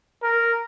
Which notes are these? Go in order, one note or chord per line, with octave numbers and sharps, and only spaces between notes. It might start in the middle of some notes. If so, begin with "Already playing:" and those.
A#4